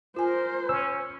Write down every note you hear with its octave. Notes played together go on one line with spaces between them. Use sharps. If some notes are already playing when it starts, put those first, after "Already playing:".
F4 A#4 C5 G#5
C#4 E6